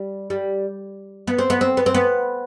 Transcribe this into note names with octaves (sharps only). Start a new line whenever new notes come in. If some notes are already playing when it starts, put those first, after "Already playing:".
Already playing: G3
G3
B3
C4
B3
C4
B3
C4
B3